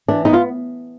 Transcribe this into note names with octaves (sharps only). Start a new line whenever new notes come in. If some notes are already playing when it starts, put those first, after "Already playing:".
E3 D4
B3 D#4
F4